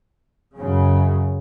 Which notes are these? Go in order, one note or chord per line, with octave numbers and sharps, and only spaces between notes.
F#2 C#3